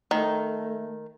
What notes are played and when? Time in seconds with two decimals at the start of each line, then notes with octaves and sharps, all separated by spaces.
0.11 D#3 A3